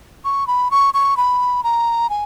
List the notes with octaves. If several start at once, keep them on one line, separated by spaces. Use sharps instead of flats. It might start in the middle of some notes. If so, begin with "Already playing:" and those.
C#6
B5
C#6
C#6
B5
A#5
G#5